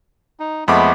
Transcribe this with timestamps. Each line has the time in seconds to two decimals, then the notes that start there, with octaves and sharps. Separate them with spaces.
0.40 D#4
0.68 F2 G#3 A3 B3 B5 D6